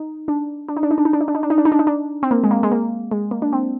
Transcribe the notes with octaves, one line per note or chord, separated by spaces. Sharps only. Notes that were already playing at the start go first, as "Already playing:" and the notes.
Already playing: D#4
D4
D4
D#4
D4
D#4
D4
D#4
D4
D#4
D4
D#4
D4
D#4
D4
D#4
D4
D#4
D4
C4
A#3
G#3
A#3
G#3
A#3
G#3
A#3
D4
C4